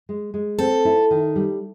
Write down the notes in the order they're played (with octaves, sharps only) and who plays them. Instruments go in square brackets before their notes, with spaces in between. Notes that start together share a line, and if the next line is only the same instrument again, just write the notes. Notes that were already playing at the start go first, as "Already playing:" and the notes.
[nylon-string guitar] G#3
G#3
[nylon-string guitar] C4 [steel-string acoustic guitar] A4
[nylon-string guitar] E4
D#3
G3